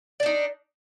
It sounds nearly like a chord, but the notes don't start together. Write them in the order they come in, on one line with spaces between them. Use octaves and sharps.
D5 D4 D#4